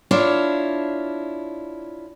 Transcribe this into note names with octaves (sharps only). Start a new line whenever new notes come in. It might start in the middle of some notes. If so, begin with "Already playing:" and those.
D4 E4 F4 C#5